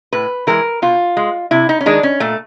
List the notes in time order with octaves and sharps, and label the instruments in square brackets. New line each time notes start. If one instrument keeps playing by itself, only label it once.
[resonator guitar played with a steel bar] A2 B4
E3 G#3 A#4
B2 F4
G#3
C3 E4
D#4
C#4
D#3 G#3 D4
C#4
A#2 A3